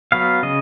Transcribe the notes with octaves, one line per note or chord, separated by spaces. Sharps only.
F#3 B3 F5
C#3 D#5